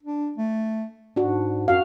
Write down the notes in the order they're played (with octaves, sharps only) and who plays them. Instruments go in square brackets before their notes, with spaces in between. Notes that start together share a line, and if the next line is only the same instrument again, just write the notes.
[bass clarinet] D4
A3
[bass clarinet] G#2 [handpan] D4 F#4
[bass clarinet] F#2 [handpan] F#4 F5